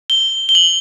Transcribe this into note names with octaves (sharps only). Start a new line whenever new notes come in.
G7
G7
F#7